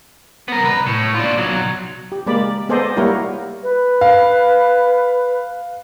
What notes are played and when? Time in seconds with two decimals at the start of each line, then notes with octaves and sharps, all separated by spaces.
0.48 B3 A#4
0.63 C2 B4
0.87 A2
1.15 D4 F4
1.38 B1 F#3
2.12 G4
2.27 G#3 A#3 D5 B5
2.69 B3 G#4 A4 C5 D5 D#5
2.96 G3 A#3 E4 F#4 A#4 C#5
3.63 B4
4.01 F5